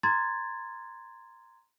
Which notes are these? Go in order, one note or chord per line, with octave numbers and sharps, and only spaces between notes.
A#5 C6 G#6 A6